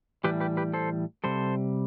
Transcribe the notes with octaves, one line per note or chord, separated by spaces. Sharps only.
A2 E3 G3 G4 B4
G4 B4
G4 B4
A4 C5
C3 G3 A4 C5